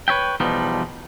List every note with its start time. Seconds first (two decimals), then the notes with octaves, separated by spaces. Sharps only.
0.08 B4 C#5 E5 G5
0.40 E2 B2 F3 G3 D#4